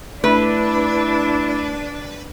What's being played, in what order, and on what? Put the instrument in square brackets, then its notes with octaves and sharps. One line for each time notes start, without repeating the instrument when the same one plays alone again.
[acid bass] A3 [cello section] D4 [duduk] E4 [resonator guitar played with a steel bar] B4